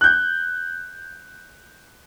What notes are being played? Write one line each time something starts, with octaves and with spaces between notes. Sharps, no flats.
F#6 G6